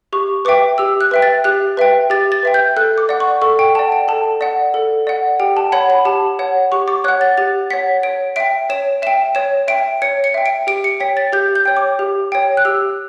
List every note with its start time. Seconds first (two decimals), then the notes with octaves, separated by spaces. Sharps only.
0.13 G4 C#6
0.45 B4 E5 G5 D6
0.78 G4 E6
1.01 F#6
1.11 B4 E5 G5
1.22 A6
1.44 G4 F#6
1.77 B4 E5 G5
2.10 G4 A6
2.32 A6
2.43 B4 E5 G5
2.54 G6
2.77 A4 F#6
2.98 D6
3.09 D5 F#5
3.20 C#6
3.42 A4 C#6
3.59 G5
3.75 D5 F#5 A5
3.92 G5
4.08 A4 A5
4.41 D5 F#5
4.74 A4
5.07 D5 F#5
5.40 G4 G5
5.57 A5
5.72 C#5 F#5 B5
5.90 B5
6.05 G4 A5
6.39 C#5 F#5
6.72 G4 C#6
6.88 D6
7.04 C#5 F#5 F#6
7.21 A6
7.37 G4 A6
7.71 C#5 F#5 B6
8.03 C#5 D7
8.36 E5 G5 D7
8.70 C#5 E7
9.02 E5 G5 E7
9.35 C#5 E7
9.68 E5 G5 D7
10.02 C#5 C#7
10.24 C#7
10.34 E5 G5
10.46 D7
10.67 G4 D7
10.84 C#7
11.00 C#5 G5 B6
11.17 A6
11.33 G4 G6
11.55 G6
11.65 C#5 G5
11.77 D6
11.99 G4
12.32 C#5 G5
12.57 F#6
12.65 G4 E6